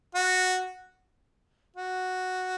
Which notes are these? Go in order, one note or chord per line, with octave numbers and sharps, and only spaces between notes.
F#4
F#4